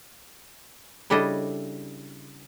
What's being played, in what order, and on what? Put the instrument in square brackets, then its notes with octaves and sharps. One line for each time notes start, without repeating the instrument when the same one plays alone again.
[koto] C#3 G3 D4 E4 A4 D#5